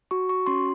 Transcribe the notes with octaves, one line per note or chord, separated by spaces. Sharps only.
F#4 C#6
C#6
C#4 C6